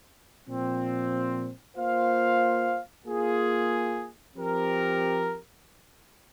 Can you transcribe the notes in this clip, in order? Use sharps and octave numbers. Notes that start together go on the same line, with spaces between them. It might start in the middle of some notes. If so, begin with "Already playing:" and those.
A#2 F3 C4
A#3 F4 C5 F5
A#3 F4 G#4
F3 C4 G4 A#4